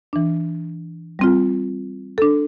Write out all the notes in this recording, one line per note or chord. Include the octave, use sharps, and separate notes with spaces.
E3 D4
G3 C4 F4
D4 A4